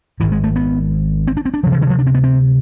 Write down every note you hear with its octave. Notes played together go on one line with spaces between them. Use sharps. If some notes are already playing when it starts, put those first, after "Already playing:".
G#1 G#2 E3
G#3
A3
B3
C4
D4
C4
D4
D2 C3 F3
E3
D3
F3
D4
C4
B3
C4